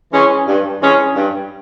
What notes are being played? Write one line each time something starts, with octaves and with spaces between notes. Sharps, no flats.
E3 G#3 C#4
G2
E3 G#3 C#4
G2